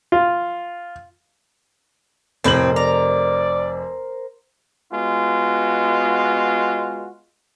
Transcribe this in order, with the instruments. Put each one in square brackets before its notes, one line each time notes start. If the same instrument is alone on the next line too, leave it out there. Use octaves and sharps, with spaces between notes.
[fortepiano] F4
[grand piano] F1 F#7 [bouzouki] A2 C4 [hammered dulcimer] A#4 C5
[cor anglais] D5 [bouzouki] A#5
[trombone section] G#3 B3 F4 F#4